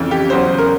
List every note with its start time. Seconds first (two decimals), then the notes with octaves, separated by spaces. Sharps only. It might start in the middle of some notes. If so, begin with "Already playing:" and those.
Already playing: F2 C#3 E3
0.11 G4
0.30 E2 C#3 F#3 C5
0.58 A#4